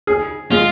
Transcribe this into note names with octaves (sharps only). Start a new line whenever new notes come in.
G#4
G#3 F4